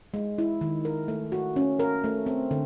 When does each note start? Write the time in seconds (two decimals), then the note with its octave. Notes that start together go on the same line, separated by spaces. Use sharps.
0.14 G#3
0.38 E4
0.61 D#3
0.85 A#4
1.08 A3
1.32 F#4
1.56 C#4
1.79 A#4
2.04 A3
2.26 C4
2.51 D3